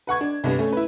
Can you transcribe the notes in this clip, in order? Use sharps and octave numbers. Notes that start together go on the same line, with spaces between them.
B4 F#5 C#6 G#6
D4
C2 G2 B3
A3 C#4
E4 B4